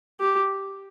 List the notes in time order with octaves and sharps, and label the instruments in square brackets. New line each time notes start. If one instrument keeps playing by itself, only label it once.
[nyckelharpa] G4